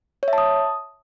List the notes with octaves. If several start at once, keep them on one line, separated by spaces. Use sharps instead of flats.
C#5
E5
A5
D#6